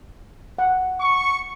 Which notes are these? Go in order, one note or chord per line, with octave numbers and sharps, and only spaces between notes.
F#5
C#6